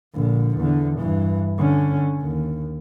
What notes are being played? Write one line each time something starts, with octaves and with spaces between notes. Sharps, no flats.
A#1 D3
E2 D3
G2 E3
D3 C#4
D#2